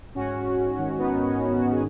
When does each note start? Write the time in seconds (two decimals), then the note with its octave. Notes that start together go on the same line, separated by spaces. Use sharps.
0.15 G#2 C#4 F#4
0.37 G#2
0.57 G#2
0.79 D#3
0.98 D#3 B3 D#4
1.20 D#3
1.27 C#4
1.41 G#2
1.54 C#4 F#4
1.61 D#3
1.72 G#4